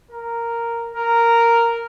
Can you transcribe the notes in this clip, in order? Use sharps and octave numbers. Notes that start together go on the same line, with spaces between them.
A#4
A#4